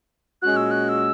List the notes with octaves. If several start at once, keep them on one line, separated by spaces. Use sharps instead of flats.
A#2 G#3 C#4 F#4 F#6
E6
F#6
E6